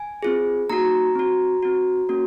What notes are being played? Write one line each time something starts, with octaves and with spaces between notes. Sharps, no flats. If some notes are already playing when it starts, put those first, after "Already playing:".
Already playing: G#5
C4 F4 G#4
A#3 D#4 F#4 A#5
C4 F#4
C4 F#4
A#3 C#4 F#4